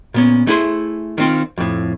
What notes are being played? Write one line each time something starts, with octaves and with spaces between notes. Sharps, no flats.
A#2 B3 C#4
A3 E4 G#4 B4 C5
D#3 C4 F4
F2 A2